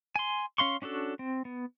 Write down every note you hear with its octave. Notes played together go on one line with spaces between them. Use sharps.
G#5 C6
C#4 F5 C6 C#6
C#4 D4 F#4 A4
C4
B3